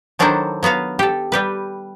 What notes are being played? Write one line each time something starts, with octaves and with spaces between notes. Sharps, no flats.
D#3 F#3 D4 E4 A4 C5
F#3 B3 F#4 F5
G4 A4
G3 G4 B4